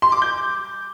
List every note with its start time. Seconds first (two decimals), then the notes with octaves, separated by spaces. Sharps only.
0.02 C6
0.12 D6
0.22 G6